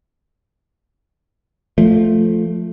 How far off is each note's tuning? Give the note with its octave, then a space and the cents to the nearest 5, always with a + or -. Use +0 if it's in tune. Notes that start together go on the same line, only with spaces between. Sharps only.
F3 +0 A3 +0